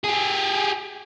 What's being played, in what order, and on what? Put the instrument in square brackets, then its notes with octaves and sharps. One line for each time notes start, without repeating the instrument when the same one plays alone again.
[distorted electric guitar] G4 G#4